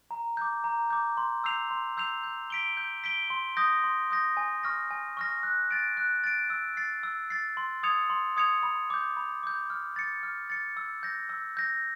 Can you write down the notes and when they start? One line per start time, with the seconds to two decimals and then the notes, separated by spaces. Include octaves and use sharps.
0.11 A#5
0.37 D6 G6
0.64 A#5
0.90 D6 G6
1.17 C6
1.44 E6 G6 C7 F7
1.71 C6
1.97 E6 G6 C7 F7
2.23 G6
2.50 B6 D7 G7
2.77 G6
3.04 B6 D7 G7
3.30 C6
3.57 D#6 G6 A#6
3.84 C6
4.11 D#6 G6 A#6
4.37 G#5
4.63 C#6 F6 A#6
4.91 G#5
5.17 C#6 F6 A#6
5.43 F#6
5.71 A6 D7
5.97 F#6
6.24 A6 D7
6.50 E6
6.77 A6 C7
7.03 E6
7.30 A6 C7
7.57 C6
7.83 D#6 G#6 C#7 F7
8.10 C6
8.37 D#6 G#6 C#7 F7
8.63 B5
8.90 D6 G6
9.17 B5
9.43 D6 G6
9.70 F6
9.96 A6 C#7
10.23 F6
10.50 A6 C#7
10.77 E6
11.03 G6 A#6
11.29 E6
11.57 G6 A#6